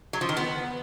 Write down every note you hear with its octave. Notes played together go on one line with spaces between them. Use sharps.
F#3
F3
D#3
B3